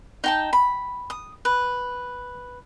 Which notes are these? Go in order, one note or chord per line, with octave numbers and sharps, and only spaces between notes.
D#4 G5 A5
B5
D#6
B4